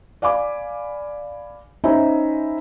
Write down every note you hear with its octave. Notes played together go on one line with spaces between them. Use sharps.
D5 F5 G#5 B5 D6
C#4 D#4 C5 E5 G#5 B5